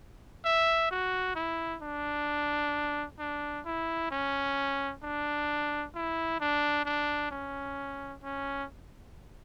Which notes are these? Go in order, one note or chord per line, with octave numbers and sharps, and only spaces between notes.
E5
F#4
E4
D4
D4
E4
C#4
D4
E4
D4
D4
C#4
C#4